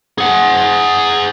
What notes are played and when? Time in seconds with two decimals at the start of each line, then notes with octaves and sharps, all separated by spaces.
0.18 G#4 F#5